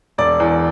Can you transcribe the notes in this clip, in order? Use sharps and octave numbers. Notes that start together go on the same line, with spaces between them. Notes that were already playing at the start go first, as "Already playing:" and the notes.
E1 D5 D6
E2